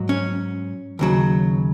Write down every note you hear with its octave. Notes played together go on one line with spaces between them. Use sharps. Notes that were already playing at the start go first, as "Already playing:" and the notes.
Already playing: G#2 F#3
C#4
D#2 C#3 F#3